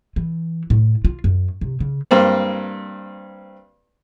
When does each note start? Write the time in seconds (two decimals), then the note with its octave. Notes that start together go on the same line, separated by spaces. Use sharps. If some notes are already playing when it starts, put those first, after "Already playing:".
0.16 E3
0.70 A2
1.05 F4
1.24 F#2
1.61 C3
1.80 C#3
2.11 G2 A#3 C4